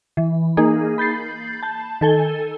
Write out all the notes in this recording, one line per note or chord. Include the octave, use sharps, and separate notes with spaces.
E3
A#3 D#4 G#4
B5 G6 A6 C7
A5 G6
D#3 A4 G#5 G7